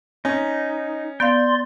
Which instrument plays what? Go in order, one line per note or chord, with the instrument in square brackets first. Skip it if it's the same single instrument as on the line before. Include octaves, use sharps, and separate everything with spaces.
[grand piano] C#4 [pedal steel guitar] D#4
[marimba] B3 F5 [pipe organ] D5 C6 [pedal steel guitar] G6